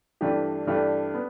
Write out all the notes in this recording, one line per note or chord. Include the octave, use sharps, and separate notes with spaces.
G2 E3 A3 D4 G4
G2 E3 A3 D4 G4
B3